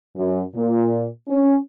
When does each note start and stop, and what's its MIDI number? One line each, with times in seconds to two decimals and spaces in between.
0.17 0.41 42
0.55 1.06 46
1.29 1.56 61